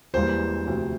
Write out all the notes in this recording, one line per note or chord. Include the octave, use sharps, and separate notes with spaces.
E1 E2 E3 G3 A#3 C5
D2 C3 F3